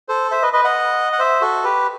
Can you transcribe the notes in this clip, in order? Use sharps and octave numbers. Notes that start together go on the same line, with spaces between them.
A4 C5
C5 E5
B4 D#5
B4 D#5
D#5 F#5
F#5
C5 E5
F#4 A4
G4 B4